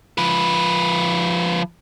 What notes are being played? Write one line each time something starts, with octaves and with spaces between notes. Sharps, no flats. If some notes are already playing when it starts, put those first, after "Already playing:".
F3 B4